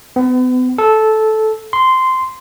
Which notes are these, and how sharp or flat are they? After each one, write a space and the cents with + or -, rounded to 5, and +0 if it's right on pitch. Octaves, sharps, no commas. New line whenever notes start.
B3 +40
A4 -10
C6 -10